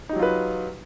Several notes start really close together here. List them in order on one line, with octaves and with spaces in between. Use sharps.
D#4 G4 F#3 F4 B4